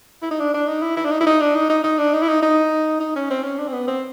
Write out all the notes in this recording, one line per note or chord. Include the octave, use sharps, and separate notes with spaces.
E4
D#4
D4
D4
D#4
E4
E4
D4
D#4
E4
D#4
D4
D#4
D#4
D#4
D4
D#4
E4
D#4
D#4
D#4
C#4
C4
C#4
D4
C4
B3
C4